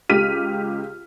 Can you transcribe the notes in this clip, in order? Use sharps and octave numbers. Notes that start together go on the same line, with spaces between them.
C#2 G4 F6 B6 D#7